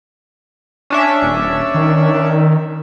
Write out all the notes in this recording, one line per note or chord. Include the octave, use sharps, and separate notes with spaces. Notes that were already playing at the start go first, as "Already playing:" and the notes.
C#4 D4 E5
D#1
D#3